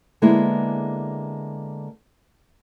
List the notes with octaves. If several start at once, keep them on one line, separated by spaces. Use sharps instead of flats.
D3 G#3 A#3 B3 E4 G#4